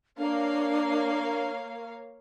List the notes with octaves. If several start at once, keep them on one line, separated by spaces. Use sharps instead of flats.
A#3 D4 C#5 F5